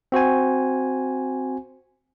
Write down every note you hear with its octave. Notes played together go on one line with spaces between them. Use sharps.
C4 F#4 C5 G#5